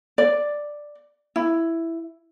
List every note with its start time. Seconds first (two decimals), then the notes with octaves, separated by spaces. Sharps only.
0.18 D5
1.36 E4